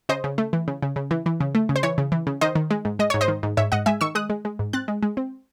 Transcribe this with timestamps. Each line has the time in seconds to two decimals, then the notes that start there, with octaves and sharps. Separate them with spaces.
0.09 C#3 C5 D#5
0.24 C#3
0.38 A3
0.53 E3
0.68 C#3
0.82 C#3
0.96 C#3
1.11 E3
1.26 E3
1.40 C#3
1.55 A3
1.69 C#3
1.76 C5
1.83 E3 C#5
1.98 C#3
2.12 E3
2.27 C#3
2.41 D#3 C5 D#5
2.55 D#3
2.71 G#3
2.85 G#2
2.99 G#3 D#5
3.10 G#2 C#5
3.21 C5 D#5
3.28 D#3
3.43 G#2
3.57 G#2 C#5 E5
3.72 G#2 D#5 F#5
3.86 G#3 E5 G#5
4.01 D#3 C#6 E6
4.15 G#3 D#6 F#6
4.30 G#3
4.45 G#3
4.59 G#2
4.73 C4 F#6 A6
4.88 G#3
5.03 G#3
5.17 C4